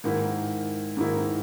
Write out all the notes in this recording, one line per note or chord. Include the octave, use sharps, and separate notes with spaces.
G#2 D#3 A#3 E4
G#2 D#3 A#3 E4